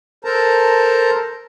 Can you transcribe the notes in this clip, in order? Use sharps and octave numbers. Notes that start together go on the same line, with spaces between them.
A4 A#4 C5 A5 A#5